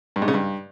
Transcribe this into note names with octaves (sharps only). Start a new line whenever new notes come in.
G2
G#2
C#3
G2